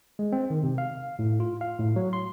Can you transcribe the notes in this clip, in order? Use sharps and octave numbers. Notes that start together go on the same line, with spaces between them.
G#3
C4
D#3
C3
F5
A2
F4
F5
A2
F#3
C6